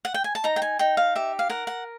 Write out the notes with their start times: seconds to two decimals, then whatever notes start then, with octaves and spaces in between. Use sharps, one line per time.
0.05 F#5
0.14 G5
0.24 G#5
0.35 A5
0.44 D#4 A#5
0.56 G5
0.62 G#5
0.79 D#4 G5
0.97 F5
1.15 G4 E5
1.39 F5
1.49 A#4 F#5
1.67 F#5